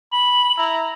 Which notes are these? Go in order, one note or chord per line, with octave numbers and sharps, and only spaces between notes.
B5 F#7
E4 A#5